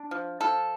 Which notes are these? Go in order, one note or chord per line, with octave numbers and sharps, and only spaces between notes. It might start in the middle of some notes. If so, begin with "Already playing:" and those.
Already playing: D4
F3
F3 A4